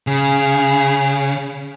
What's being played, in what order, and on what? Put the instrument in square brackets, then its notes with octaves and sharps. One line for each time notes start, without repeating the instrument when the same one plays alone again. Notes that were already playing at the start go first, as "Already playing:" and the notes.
[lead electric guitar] C#3 [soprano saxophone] G#4